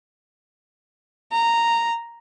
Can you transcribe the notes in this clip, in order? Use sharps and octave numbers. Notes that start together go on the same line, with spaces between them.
A#5